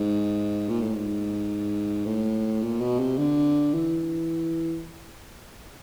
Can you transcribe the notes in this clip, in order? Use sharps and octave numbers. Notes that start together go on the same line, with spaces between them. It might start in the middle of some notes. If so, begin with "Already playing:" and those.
Already playing: G#2
A#2
A2
G#2
A2
A#2
B2
C3
D3
E3